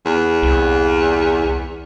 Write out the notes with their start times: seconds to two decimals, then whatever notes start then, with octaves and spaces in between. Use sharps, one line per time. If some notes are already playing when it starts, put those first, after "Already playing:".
0.06 E2
0.43 C2